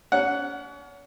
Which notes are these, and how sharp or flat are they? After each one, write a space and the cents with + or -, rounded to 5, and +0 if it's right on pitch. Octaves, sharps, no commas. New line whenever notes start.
C#4 +40 F#5 +0